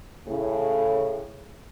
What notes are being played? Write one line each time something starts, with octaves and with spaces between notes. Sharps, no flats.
A2 C#3